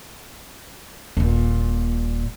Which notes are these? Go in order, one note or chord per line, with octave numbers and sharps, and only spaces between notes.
D#1 A#2